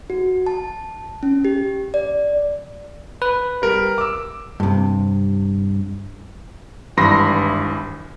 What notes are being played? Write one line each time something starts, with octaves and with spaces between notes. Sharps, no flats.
F#4
A5
C#4
G4
D5
B4
G3 A#4
D6 E6
G2 C3
G#1 G2 E3 B5 C6 A#6